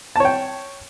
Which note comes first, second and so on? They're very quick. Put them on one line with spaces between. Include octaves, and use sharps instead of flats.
A5 C#5 G5